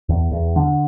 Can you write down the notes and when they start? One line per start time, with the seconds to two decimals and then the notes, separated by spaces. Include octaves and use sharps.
0.09 E2
0.31 E2
0.56 D3